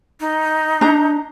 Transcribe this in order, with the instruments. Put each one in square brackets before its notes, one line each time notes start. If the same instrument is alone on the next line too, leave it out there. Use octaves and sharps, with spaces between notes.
[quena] D#4
[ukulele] D4 A#5